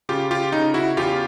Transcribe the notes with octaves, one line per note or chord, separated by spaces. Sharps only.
C#3 F4 G4
F4 G4
C#3 D#4
E4 F#4
E2 F4 G4